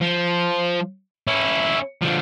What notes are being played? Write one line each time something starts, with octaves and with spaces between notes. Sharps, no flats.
F3
C#4 E4
D3 F3